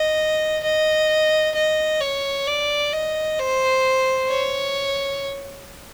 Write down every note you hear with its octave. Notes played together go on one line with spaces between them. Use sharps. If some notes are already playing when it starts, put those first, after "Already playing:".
Already playing: D#5
D#5
D#5
C#5
D5
D#5
C5
C#5